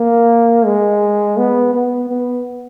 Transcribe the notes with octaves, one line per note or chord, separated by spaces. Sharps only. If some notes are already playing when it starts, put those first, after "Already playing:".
Already playing: A#3
G#3
B3
B3
B3